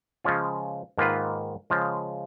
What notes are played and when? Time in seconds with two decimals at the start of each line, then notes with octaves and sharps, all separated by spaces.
0.24 C#3 F3 G#3 C#4 F4
0.98 G#2 D#3 A#3 F4 B4
1.70 C#3 F3 G#3